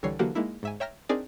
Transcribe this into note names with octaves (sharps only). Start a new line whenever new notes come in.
C2 D3 E3 G3 C#5 C7
D3 E3 F#3 A#3 F#4 G4
G#3 A#3 D#4 E4
G#2 E5 G#5
C#5 E5 G5 A#5 F6 A#6
C4 D4 D#4 G#4 A#4 D5